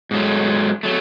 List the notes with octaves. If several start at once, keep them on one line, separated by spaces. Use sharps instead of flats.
G#2 F#3 A3
F#3 A3